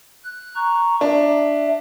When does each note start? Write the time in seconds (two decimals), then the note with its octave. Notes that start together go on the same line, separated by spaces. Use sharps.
0.24 F#6
0.56 A#5 C#6
1.01 D4 E5